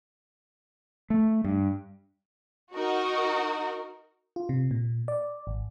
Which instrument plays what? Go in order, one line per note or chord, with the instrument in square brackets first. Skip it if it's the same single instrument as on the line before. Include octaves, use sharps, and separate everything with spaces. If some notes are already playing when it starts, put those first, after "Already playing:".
[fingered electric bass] A3
G2
[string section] D#4 F#4 A#4
[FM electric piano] F4
C3
A#2
D5
G#1